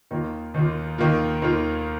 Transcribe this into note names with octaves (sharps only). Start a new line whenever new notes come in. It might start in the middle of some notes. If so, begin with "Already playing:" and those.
D#2 D#3 A#3 F4
D#2 D#3 A#3 F4
D#2 D#3 A#3 F4
D#2 D#3 A#3 F4